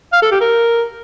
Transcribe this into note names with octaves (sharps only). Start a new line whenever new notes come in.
F5
A4
G4
A#4